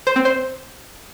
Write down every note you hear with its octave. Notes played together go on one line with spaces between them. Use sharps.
C5
C4
C5